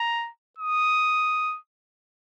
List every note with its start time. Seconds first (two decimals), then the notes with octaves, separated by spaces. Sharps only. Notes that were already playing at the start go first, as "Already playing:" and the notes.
Already playing: A#5
0.58 D#6